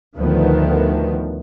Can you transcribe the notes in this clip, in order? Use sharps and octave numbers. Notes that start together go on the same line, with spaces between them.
D2 A2 D#3 F3 A3 B3